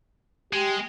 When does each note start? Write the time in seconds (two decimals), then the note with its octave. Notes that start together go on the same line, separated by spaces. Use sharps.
0.53 G#3 G4